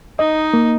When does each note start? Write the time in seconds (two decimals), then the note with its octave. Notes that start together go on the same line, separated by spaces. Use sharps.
0.19 D#4 D#5
0.54 A#3